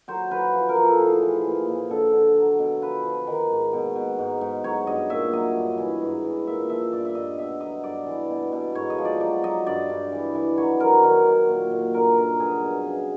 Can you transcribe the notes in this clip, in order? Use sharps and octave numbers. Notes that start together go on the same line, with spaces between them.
F#3 C5
F#3 B4
F3
A#4
F3
A4
A2 G#4
E3
A#2
A#2
D3 A4
D3
F#3
B2
F3 B4
F3
D#3
G#2
B2
B2
G#2
G#2
F#3 C#5
G2 D#5
A#2 E5
F#3 D#5
G2
E3
G#2
E3
A#2 E5
F3 E5
G2 D5
E5
G2 D#5
B2 E5
F#3 D#5
G2 D5
E3
B2
B2
G#2 C#5
D#5
F3
D5
F#3 D5
F#3 D#5
G2 D5
G2
E3
E3
F#3 C#5
F#3 A#4
D#3 A#4
F#3
A#2
A#2
G2 A#4
G2 A#4
F#3 G#4
B2
C#3